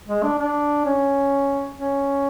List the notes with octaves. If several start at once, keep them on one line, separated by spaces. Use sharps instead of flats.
G#3
D4
D4
C#4
C#4